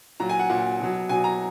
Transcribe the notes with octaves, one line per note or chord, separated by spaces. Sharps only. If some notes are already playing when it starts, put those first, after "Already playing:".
A#2 F#3 A#5
G#5
F#5
A#2 F#3 F#5
B2 F#3
B2 F#3 G#5
A#5